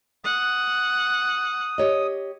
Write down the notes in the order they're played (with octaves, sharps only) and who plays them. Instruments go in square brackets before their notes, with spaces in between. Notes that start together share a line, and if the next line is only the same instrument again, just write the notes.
[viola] F#5 [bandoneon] D#6
[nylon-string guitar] G4 C#5 D#5